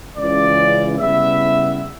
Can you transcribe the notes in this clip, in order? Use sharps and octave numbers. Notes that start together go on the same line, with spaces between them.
C#2 C#3 E3 D5
C#3 G3 B3 E4 E5